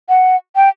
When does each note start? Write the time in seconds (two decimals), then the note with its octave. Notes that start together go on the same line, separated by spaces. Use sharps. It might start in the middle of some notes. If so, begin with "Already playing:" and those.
0.09 F#5
0.56 G5